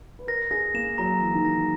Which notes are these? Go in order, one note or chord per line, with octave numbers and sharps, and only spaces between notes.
B4
A#4 A#6
G#4 A#6
A#3 E7
F#3 A#5
E3 A#5
D#3
E3 A#6